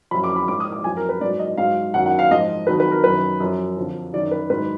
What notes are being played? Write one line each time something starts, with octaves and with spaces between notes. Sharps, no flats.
F#2 F3 B5
D6
B5
G#2 F3 D6
D#6
D6
F#2 F3 G#5
A#4
B4
G#2 F#3 D5
D#5
G#2 F#3 F5
F#2 D#3 F#3 F#5
F#5
F5
G#2 F3 D#5
F2 D#3 F#3 B4
B4
A#4
F#2 D#3 F#3 B4
F#2 F3
F2 D3 F3
F#2 D#3 F#3 D5
B4
G#2 D#3 F#3 B4